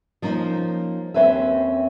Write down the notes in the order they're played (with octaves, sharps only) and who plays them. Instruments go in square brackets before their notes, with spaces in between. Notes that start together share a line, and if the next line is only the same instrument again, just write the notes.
[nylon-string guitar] F3 A#3 C#4 D#4
D#2 C4 C#4 B4 E5